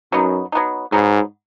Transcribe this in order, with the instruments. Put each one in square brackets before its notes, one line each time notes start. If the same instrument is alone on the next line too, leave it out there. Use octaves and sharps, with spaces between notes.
[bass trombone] F#2 [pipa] F#3 B3 D#4
[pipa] F#3 B3 D#4
[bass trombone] G#2 [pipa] F#3 B3 D#4